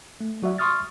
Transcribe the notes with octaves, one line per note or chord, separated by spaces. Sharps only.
A3
F#3 F#4 D5 E5
C6 C#6 D#6 F6 A6